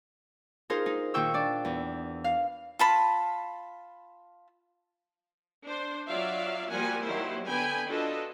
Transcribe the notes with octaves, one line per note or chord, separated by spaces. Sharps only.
D#4 F4 G#4 A#4 C5
D#4
A#2 D#3 F4 G5 C#6 E6
D4 D5
E2
F5
F4 A5 B5
D4 C5
F#3 F4 D5 E5 F5
F3 G3 A#3 F#4 F#5 G#5
D#3 F#3 G3 A#3 E4 C5
D3 B3 G5 G#5 B5
D4 F4 F#4 A4 B4 D#5